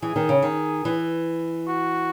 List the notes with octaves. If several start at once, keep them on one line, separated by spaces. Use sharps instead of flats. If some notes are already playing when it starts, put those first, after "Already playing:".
E3 G#4
D#3
C#3
D#3
E3
F#4